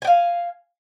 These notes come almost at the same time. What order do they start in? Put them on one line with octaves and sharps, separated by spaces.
G#5 G5 F5